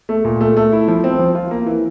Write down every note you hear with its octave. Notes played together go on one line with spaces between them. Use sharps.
A3
A#2
A3
A3
E4
F3
C4
F3
F4
A#3
E3